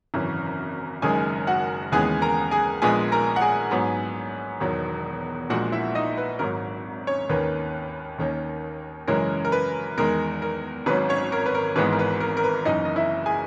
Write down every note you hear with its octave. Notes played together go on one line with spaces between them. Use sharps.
G#1 F#2 C#3 E3
F#1 F#2 D#3 G#3 G#4 G#5
F#4 F#5
D#2 C#3 E3 G#3 B3 G#4 G#5
A#4 A#5
G#4 G#5
A#1 A#2 G#3 B3 G#4 G#5
A#4 A#5
F#5
G#4 G#5
G#2 F#3 B3
E1 E2 D#3 F#3
A#1 A#2 G#3 F#4 F#5
E4 E5
D#4 D#5
B4
G#1 G#2 F#3 A#4
C#4 C#5
D#2 D#3 A#3 C#4 B4
D#2 D#3 A#3 C#4
F#2 C#3 E3 G#3 C#4 A#4
A#4
B4
E2 D#3 G#3 A#4
A#4
G#1 G#2 F#3 C#4 B4
C#4 C#5
A#4
B4
A#4
G#1 G#2 E3 G#3 B3 B4
A#4
B4
A#4
A#4
B4
F#1 F#2 E3 D#4 D#5
D#5
E4 E5
G#4 G#5